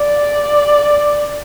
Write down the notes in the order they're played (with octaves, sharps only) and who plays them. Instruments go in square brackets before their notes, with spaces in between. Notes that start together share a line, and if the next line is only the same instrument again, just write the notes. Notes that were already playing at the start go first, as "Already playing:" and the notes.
Already playing: [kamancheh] D5